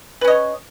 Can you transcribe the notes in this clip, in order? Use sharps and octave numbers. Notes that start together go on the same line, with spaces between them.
C#4 B4 C#5 D#5